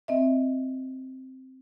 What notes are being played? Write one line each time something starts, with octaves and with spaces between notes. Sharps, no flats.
C4 D#5 E5